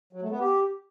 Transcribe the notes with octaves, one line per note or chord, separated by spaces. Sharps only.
F#3
A3
B3
G4